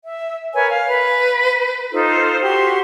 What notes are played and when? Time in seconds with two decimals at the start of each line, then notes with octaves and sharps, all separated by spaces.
0.04 E5
0.54 A#4 B4 C#5 G#5
0.70 F5
0.86 B4
1.92 D#4 F4 A4 C5
2.41 F#4 G4 C6